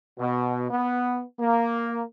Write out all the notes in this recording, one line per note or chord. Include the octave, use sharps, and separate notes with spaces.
B2
B3
A#3